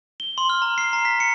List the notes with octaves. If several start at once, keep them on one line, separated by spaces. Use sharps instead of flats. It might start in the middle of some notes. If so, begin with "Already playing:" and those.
G7
C6
F6
A#5
C7
A#5
B6
C#7